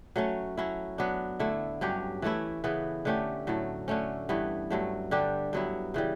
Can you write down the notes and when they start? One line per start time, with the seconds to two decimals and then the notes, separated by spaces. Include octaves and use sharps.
0.16 F#3 A3 C#4
0.57 F#3 C#4 E4
0.98 F#3 B3 D4
1.39 D3 A3 E4
1.81 G2 F#3 C#4 G4
2.22 E3 A3 C#4 E4
2.64 C#3 E3 B3
3.05 D3 A3 C#4 G4
3.47 A2 F#3 A3
3.88 D3 A3 C#4
4.29 G2 E3 B3
4.70 G2 F#3 A3
5.11 D3 G3 D4 G4
5.53 G2 F#3 B3 E4
5.94 C#3 E3 G3